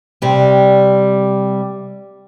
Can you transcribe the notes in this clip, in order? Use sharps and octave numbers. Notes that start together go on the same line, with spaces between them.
C3 G3